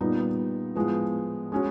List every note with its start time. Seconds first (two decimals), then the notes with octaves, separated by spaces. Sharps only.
0.01 A#2 G3 B3 D#4
0.75 A2 F3 G#3 B3
1.52 G#3 C#4 F#4